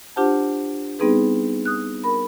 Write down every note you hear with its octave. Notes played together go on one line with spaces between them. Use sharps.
D4 F4 G4 C5 F#5 A5
G3 B3 C4 D#4 G#4 B4
D#6 F#6
A#4 B5